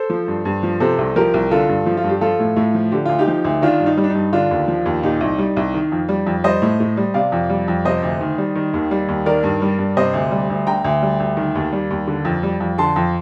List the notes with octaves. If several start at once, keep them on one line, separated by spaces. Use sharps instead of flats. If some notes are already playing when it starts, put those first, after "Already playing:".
Already playing: A4 C5
F3
G2
G2
F3
C3 A4 C5
C2
F3 G4 A#4
C2
D3 F4 A4
G2
F3
F4
G2
G4
F3 F4 A4
A2
A2
F3
D3 G4
D2 F4
D#4 G4
F3
D2
D#3 D4 F4
G2
D#4
G3
D4
G2 D#4
D3 D4 F4
D#2
F3
D#2
A#2 D#4 G4
C2
G3
C2
D#3
F2
G3
F2
G3 C5 D#5
A2
A2
G3
C3 D5 F5
F2
G3
F2
C3 C5 D#5
D2
D#3
G3
D#3
D#2
G3
D#2
D#3 A#4 D5
G2
G3
G2
C3 C5 D#5
D2
G3
D2
D3 G5 A#5
D2
G3
D2
D#3
D#2
G3
D#2
D3
F2
G3
F2
D3 A5 C6
F2